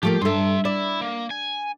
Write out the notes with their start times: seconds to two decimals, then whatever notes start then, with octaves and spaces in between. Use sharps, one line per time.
0.03 F3 A3 A#3 G4
0.22 G2 A4 E5 C6
0.65 E4 D5
1.01 A#3
1.30 G#5